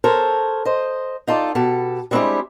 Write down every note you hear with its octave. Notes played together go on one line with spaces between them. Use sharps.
A4 A#4 C5 C#5
C5 D#5
D#4 F4 A4 D5
B2 G4 A4
G3 G#3 C4 D4 E4 G4